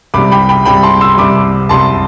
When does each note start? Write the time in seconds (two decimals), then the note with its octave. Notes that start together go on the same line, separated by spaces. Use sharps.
0.14 C2 C3 G3 B5 D6
0.32 G5 B5
0.49 G5 B5
0.65 C2 C3 G3 G5 B5
0.83 A5 C6
1.01 C6 E6
1.17 C2 C3 G3 B5 D6
1.69 C2 C3 G3 A5 C6